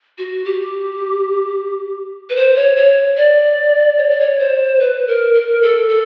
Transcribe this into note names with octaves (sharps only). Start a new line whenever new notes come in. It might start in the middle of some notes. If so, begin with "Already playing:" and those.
F#4
G4
B4
C5
C#5
C#5
D5
C#5
D5
C#5
C5
B4
A#4
A#4
A4
A4